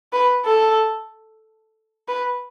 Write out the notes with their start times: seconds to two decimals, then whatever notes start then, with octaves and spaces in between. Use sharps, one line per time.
0.13 B4
0.45 A4
2.08 B4